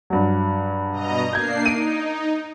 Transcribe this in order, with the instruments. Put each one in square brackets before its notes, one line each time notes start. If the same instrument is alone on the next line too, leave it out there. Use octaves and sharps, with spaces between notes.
[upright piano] G2 F#3
[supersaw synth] B2 D#5 A#5
[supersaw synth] A#3 D4 C7 [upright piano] G6 G#6
[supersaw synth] D#4 [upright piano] D7 D#7